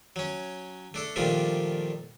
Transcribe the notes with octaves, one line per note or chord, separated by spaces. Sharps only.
F#3 C#4
A3 D4 A4
A#2 D#3 F3 G3 A3 D4